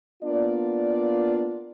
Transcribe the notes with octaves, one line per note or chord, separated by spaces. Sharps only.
A#3 B3 D4 F4 D5